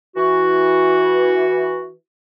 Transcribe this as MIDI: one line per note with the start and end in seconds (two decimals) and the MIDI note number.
0.17 1.91 52
0.17 1.91 66